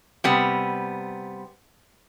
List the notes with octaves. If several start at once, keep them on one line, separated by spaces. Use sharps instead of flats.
C3 G3 B3